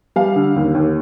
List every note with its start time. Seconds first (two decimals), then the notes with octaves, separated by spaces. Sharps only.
0.16 G3 F5
0.36 D3
0.56 D#2
0.75 D#2